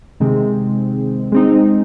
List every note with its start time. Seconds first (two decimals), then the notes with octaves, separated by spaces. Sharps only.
0.20 C3 D#3 G#3 C4
1.32 G#3 C4 D#4